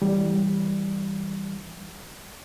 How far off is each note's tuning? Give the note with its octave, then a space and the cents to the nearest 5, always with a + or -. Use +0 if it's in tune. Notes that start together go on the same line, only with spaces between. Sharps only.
E3 -10 G3 +0